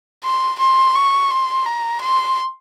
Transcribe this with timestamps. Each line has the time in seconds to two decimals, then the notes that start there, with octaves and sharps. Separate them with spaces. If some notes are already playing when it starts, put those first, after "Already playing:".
0.24 C6
0.59 C6
0.95 C#6
1.31 C6
1.66 A#5
2.02 C6